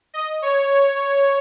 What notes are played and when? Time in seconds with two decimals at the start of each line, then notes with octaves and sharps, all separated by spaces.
0.14 D#5
0.42 C#5